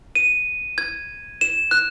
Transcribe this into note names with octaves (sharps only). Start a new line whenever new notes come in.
D#7
G#6
E7
F#6